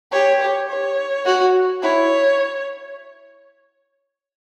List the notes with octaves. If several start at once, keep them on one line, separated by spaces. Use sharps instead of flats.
G4 C#5
C#5
C#5
F#4
E4 C#5